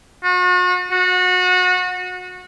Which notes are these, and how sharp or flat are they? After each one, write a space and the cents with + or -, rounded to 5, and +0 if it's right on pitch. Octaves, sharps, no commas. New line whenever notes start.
F#4 -40
F#4 -25